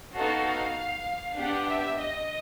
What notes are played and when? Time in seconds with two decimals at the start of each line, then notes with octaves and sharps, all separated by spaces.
0.16 B3 D#4 F#4 A4 F5
1.36 B3 D4 G4 F#5
1.67 E5
1.97 D#5